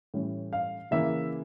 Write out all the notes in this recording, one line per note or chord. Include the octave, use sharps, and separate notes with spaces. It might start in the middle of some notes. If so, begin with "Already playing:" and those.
A2 E3 G3 C#4
F5
C#3 E3 A#3 E5